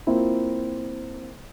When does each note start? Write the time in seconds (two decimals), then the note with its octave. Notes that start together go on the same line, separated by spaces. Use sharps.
0.07 A#3 C4 E4 F4